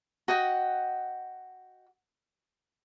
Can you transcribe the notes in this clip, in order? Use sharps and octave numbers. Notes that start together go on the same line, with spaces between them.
F#4 D#5 F#5 G5